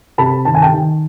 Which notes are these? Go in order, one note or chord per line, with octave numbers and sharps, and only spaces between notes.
C3 A5 B5
D#3 A5
G#5
G5 A5
D#3